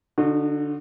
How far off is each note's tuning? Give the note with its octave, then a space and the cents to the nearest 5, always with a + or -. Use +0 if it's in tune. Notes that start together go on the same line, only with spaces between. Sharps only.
D3 +0 D#4 -35 F#4 -25